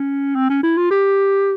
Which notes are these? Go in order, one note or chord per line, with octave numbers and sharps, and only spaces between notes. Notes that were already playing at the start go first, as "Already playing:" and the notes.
Already playing: C#4
C4
C#4
E4
F4
G4